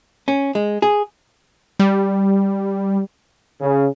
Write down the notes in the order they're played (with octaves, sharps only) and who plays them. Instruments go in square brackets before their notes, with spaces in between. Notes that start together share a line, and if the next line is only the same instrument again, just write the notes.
[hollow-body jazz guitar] C#4
G#3
G#4
[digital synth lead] G3
[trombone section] C#3